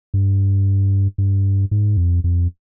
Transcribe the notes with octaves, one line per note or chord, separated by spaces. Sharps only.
G2
G2
G#2
F2
F2